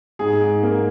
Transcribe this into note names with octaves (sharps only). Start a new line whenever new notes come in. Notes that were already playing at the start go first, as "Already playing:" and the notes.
G#2 G#4
G#2
A#3